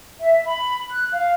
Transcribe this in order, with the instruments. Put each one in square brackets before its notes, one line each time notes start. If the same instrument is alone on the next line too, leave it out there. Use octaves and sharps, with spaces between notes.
[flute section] E5
B5
F#6
F5